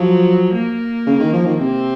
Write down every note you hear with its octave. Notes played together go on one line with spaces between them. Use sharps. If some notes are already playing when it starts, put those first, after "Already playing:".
Already playing: F3 F#3
A#3
C#3
D#3
F3
D#3
C3 C4